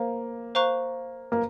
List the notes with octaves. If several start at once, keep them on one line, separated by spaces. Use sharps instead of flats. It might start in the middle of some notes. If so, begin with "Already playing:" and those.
Already playing: A#3 C5 F5
C5 F5 A#5 C#6 F#6
A#3